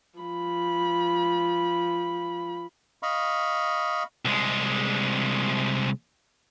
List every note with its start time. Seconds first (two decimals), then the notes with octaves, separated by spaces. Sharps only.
0.19 F3 B5
3.03 D#5 F5 B5 C#6
4.25 C2 G#3